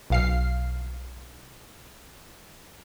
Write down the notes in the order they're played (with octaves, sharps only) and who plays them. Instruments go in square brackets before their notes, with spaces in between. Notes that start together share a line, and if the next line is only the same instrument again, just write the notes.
[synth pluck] B1 F5 C7